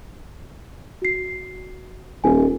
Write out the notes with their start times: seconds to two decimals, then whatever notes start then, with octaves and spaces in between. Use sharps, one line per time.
1.02 F#4 C7
2.24 D#1 G#5